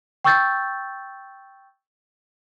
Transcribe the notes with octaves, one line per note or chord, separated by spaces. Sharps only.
G5 C#6 E6 G6 A6